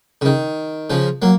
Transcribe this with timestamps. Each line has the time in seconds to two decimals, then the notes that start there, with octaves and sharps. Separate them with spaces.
0.21 C#3
0.25 D#3
0.90 C#3 F3
1.22 F#3 A#3